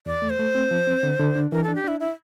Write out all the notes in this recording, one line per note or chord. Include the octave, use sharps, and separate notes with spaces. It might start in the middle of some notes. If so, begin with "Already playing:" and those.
E2 D5
A3
C5
A3
C4
F3
C4
D3
D3
D4
E3 A#4
D4 A4
G4
D4 E4
E4